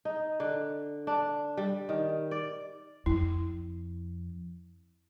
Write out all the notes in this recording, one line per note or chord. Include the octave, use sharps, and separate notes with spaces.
D#4
D3
D4
G3
D#3
D5
F2 E4